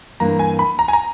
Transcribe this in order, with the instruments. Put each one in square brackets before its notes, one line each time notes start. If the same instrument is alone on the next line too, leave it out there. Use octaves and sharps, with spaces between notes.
[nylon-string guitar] G2 E3 A#3 [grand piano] A#5
[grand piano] G#5
B5
A#5
G#5
A#5